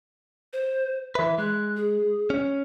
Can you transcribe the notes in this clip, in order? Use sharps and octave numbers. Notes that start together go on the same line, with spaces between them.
C5
E3 B4 E5
G#3 F#6
G#4
C#4